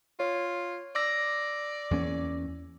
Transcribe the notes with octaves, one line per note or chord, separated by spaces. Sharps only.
F4 C#5
D5 D6 E6 A#6
E2 A#3 C#4